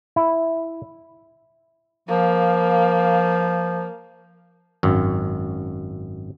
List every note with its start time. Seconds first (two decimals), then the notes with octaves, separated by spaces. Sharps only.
0.16 E4
2.08 F3 A#3 F5
4.83 G#1 F#2